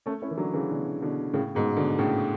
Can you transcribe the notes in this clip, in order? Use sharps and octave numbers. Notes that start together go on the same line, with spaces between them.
A3 C#4
C#4 E4
E3
D3 F#3
C#3 E3
B2 D3
B2 D3
A2 C#3
G#2 B2
B2 D3
A2 C#3